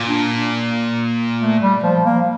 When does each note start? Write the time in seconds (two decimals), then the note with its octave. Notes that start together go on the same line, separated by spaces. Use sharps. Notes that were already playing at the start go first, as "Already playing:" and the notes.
Already playing: A#2
0.09 D4
1.40 A3
1.61 G3
1.83 F3
2.05 A#3